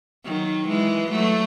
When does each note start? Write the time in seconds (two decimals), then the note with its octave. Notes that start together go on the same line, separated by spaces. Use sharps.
0.25 D#3 F#3
0.68 E3 G#3
1.11 F#3 A3